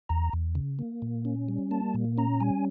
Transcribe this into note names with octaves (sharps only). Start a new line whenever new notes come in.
E2 A#5
E2
C#3
A#3
A#2
C#4
G3
A#3 A5
A#2
C#4 A#5
G3 G#5